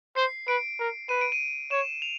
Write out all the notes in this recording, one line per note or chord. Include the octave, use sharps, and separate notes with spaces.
C5 C7
B4 D7
A#4
B4 D#7
D7
D#7
C#5 E7
F7